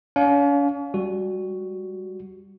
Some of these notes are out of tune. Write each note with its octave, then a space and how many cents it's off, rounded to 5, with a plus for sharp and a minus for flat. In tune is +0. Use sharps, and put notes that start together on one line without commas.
C#4 +40 F5 +15
G3 +0 F#4 +0